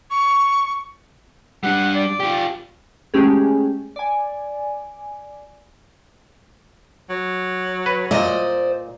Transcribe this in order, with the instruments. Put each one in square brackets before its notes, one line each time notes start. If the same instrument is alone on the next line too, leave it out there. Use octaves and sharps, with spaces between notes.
[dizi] C#6
[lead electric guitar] G3 D4 [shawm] F#5
[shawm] D5
[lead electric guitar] F4 G4
[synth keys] G#3 A3 C#4 G4 G#4
D5 G#5
[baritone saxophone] F#3
[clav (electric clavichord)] B4
[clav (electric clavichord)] A#2 [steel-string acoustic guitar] C5 D5 D#5